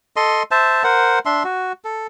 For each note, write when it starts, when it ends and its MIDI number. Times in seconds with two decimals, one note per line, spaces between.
0.16 0.43 69
0.16 0.43 75
0.16 0.43 84
0.51 0.83 72
0.51 0.83 76
0.51 0.83 81
0.84 1.19 70
0.84 1.19 72
0.84 1.19 78
1.26 1.43 62
1.26 1.43 76
1.26 1.43 84
1.44 1.72 66
1.84 2.07 69